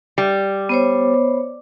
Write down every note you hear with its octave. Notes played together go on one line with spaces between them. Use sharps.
G3
B3 C5 C#5